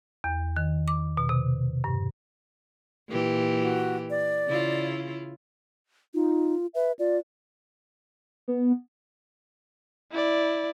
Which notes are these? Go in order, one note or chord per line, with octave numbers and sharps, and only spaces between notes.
E2
D#3
D6
B2
C3
G2
A#2 E3 G4
F#4
D5
C#3 E4 F4
D#4 F4
B4 E5
F4 D5
B3
E4 D5